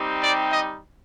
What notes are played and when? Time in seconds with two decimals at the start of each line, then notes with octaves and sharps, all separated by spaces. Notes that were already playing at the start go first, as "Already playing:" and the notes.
Already playing: G3 C4 D#4 G4
0.23 D5
0.50 D#5